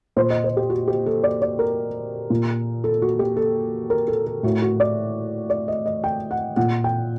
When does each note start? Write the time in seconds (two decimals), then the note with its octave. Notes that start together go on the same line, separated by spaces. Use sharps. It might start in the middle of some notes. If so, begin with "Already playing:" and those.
0.16 A#2 C5
0.30 D#5
0.44 C5
0.57 G4
0.70 F#4
0.88 G4
1.06 A4
1.24 D5
1.42 D5
1.59 A#4
2.30 A#2
2.84 A4
3.02 F#4
3.19 G4
3.37 A4
3.90 A#4
4.08 A4
4.26 A4
4.43 A2 F#4
4.62 F#4
4.80 D5
5.50 D5
5.68 D#5
5.86 D#5
6.04 G5
6.31 F#5
6.56 A#2 F#5
6.84 G5